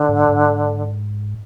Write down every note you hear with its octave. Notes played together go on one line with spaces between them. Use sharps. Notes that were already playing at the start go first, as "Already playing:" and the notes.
Already playing: D3
G#2
G#2